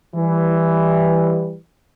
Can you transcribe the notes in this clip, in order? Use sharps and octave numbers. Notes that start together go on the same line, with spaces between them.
E3 G3